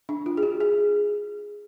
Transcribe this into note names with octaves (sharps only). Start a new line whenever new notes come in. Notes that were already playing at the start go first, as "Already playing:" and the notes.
D4
F4
G#4
F#4
G#4